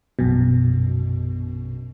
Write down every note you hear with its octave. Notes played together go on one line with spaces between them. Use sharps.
A#1 F#2 B2